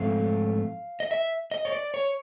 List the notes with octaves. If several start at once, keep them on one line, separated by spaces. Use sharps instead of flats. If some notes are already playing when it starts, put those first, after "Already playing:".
Already playing: G#2 F3 A3 C4 F5
D#5
E5
D#5
C#5
D5
C#5